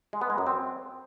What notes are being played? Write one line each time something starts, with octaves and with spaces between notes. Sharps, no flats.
G#3
B3
G#3
F#2
C4